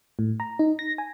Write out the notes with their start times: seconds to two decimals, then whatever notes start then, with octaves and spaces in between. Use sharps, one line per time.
0.19 A2
0.40 A#5
0.59 D#4
0.79 A#6
0.98 G#5